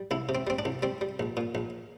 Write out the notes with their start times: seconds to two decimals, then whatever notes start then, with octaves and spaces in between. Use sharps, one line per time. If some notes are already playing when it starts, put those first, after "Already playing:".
Already playing: G3
0.11 C2 E4
0.29 C3
0.35 C4
0.47 G3 C4
0.59 D4
0.65 C2
0.83 G3 C4
1.01 G3
1.20 A#1
1.37 A#2
1.55 A#1